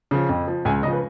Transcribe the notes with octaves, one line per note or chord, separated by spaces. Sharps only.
C#3 F3
F2
F3
C#2 G#5
C#3 F3 D#5
B4